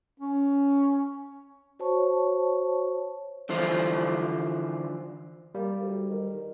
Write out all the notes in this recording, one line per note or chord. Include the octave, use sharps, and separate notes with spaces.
C#4
F#4 C5 C#5 A5 C#6
D3 E3 F3 C5
G3 A#3
D2
D#3